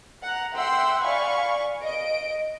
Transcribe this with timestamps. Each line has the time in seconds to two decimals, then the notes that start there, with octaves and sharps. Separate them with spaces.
0.22 F#5 A#5
0.53 E5 F#5 G5 C6 E6
1.03 D5 F5 G#5 B5 C#6
1.83 D#5 D7